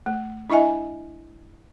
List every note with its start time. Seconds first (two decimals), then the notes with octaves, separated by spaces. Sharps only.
0.06 A3
0.50 D4 E4 D#5 E5 G#5